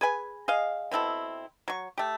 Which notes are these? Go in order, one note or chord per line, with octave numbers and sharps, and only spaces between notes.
G#4 B4 G#5
G#4 D#5 F5
B2 C4 E4 A4
F#3 C#6
A3 G4